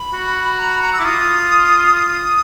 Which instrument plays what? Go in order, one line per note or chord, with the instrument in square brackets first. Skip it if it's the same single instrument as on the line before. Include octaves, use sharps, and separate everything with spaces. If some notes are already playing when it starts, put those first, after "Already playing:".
Already playing: [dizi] B5
[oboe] F#4
[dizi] A#5
B5
A#5
E6
[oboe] E4 [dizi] D6
[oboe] F4 [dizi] D#6
[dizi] D#6